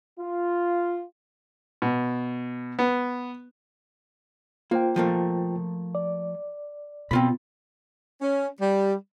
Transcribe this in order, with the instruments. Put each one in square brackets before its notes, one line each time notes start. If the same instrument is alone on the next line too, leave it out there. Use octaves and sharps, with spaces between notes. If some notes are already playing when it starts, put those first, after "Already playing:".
[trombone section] F4
[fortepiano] B2
B3
[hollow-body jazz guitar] A#3 [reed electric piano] F4 C5 G5
[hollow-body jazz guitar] F3 A3 A#3
[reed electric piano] D5
[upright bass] B2 [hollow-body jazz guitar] C4 F4 B5
[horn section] C#4
G3